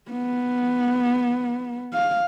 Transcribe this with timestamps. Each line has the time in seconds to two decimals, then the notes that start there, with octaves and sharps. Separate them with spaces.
0.11 B3
1.94 F5